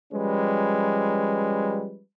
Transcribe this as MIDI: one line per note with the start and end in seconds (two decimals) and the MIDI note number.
0.13 2.02 53
0.13 2.02 55
0.13 2.02 56
0.13 2.02 61
0.13 2.02 71